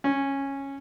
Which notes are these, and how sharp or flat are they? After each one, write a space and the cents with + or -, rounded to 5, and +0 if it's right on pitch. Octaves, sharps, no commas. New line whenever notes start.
C#4 -10